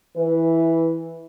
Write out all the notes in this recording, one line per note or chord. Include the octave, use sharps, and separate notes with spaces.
E3 B4